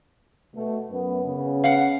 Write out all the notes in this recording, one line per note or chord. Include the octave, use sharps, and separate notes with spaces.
B2 A3
F#2 B3
C#3 B3
F5 F#5